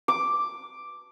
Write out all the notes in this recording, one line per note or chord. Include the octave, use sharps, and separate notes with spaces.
D6